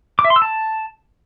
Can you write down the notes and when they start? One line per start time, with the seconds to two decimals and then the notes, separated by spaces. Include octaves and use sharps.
0.19 D6
0.25 E5
0.30 C6
0.36 E6
0.42 A5